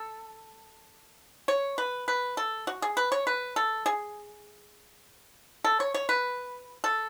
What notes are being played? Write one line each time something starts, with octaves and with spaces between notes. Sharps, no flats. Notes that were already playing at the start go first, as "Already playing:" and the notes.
Already playing: A4
C#5
B4
B4
A4
F#4
G#4
B4
C#5
B4
A4
G#4
A4
C#5
C#5
B4
A4